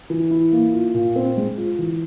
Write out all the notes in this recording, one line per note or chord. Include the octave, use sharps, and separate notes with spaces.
E3
E4
A#3
F4
A#2
C4
G#3
F4
E3